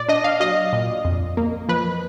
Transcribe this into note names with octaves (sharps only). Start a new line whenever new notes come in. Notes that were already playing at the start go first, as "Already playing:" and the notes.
Already playing: A#2 D5
D4 D#5
F5
F#3 D#5
A#2
F2
A#3
F3 B4